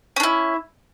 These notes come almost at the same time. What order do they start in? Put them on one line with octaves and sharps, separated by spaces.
C#4 D4 E4